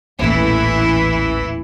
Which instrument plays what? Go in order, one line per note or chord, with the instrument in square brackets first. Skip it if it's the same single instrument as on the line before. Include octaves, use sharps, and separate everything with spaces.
[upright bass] D#1 A2 [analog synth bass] A1 [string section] E3 E4